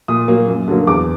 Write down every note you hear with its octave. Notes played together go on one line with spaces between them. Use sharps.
A#2 D#6
F#3 A#3
F#2
D3 F#3 A#3
E2 D6